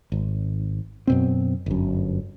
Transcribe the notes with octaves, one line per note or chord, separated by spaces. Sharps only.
G#1
F#2 B2 C4
G1 F#2